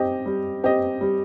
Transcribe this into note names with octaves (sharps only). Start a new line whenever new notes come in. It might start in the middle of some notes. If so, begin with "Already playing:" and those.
Already playing: C4 G4 D#5
G3
C4 G4 D#5
G3